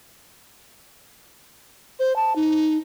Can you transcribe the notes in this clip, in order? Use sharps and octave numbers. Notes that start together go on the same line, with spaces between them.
C5
A5
D#4